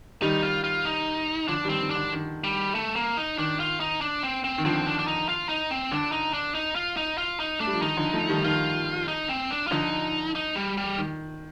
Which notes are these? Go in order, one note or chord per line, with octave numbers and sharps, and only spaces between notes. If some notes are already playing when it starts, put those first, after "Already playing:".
D#3 G3 D#4
F4
F4
D#4
D3 F3 D4
D#3 G3
C4
D#3
D3 D4
D#3
G3
A3
A#3
D#4
D#3 D4
F4
D#4
D4
C4
C4
D#3
D3 F3 C4
D4
D4
D#4
F4
D#4
C4
D3 D4
D#4
D4
D#4
F4
D#4
F4
D#4
A3 D4
G3
F3
D#3 D#4
D3 F3
F3 A3
D#3 G3
D#3 F4
D#4
C4
D4
F4
D3 F3 D#4
D#4
G3
G3
D#3